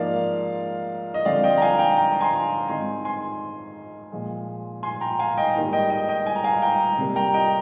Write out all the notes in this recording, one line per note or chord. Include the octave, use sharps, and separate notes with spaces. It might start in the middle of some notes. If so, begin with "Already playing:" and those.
Already playing: G#2 F3 A#3 D5 F5
D#5
D3 F3 C4 D5 F5
D#5 G5
A#5
F5 G#5
G5 A#5
G5 A#5
A#5
G#5 C6
G#2 D#3 G#3 C4 G#5 C6
G#5 C6
A#2 F3 G#3
G#5 C6
G5 A#5
F5 G#5
D#5 G5
G#2 D#3 G3 A#3
D#5 G5
D#5 G5
D#5 G5
G#5
A#5
F5 G#5
G5 A#5
C3 G3 A#3
G5 A#5
D#5 G5